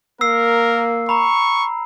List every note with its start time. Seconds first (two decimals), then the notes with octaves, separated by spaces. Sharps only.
0.21 A#3 A#4 E6 C7
1.09 A#5 B5 C#6